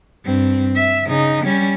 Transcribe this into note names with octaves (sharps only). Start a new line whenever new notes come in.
G2 C4
E5
C#3 D#4
G3 C#4